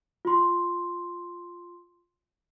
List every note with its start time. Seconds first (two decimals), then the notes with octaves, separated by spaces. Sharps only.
0.25 F4 C6